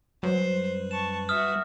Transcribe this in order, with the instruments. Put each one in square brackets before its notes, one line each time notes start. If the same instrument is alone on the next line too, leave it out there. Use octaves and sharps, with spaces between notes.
[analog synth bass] F#2 [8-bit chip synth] G3 B4 [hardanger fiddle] C5
[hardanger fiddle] A5 C#6 [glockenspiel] E7
[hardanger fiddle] F#4 E5 [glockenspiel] D#6 F6